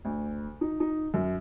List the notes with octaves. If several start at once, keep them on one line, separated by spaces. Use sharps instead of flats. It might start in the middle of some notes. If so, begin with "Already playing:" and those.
D2
D#4
D#4
F#2